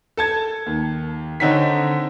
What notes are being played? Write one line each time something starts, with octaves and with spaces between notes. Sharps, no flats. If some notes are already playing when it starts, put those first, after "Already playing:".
A4 A5 G#6
D#2
D3 C4 D#4 C#5 B6